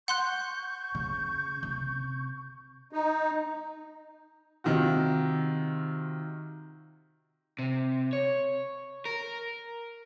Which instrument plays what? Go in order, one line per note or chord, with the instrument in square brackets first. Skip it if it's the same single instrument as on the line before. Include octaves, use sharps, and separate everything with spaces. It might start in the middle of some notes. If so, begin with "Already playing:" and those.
[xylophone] F#5 C6 F#6 [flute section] C#6 G6
[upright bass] C#3
C3
[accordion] D#4
[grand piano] C3 D#3 F4 F#4
[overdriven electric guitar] C3
C#5
A#4